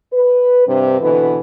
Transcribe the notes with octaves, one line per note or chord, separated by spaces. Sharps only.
B4
G2 C3
B2 D3 E3 B3